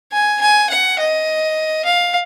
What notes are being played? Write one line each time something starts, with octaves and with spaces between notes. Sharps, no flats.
G#5
G#5
F#5
D#5
F5